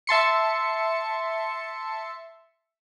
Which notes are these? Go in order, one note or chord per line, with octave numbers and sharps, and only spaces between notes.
E5 A5 C6 C#7